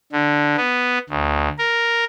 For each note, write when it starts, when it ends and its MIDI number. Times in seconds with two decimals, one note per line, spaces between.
0.12 0.56 50
0.57 0.99 59
1.09 1.49 38
1.58 2.04 70